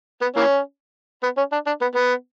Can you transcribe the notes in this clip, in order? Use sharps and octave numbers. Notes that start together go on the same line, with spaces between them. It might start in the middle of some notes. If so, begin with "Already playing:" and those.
B3
E3 A#3 C#4
B3
C#4
D4
D4
B3
B3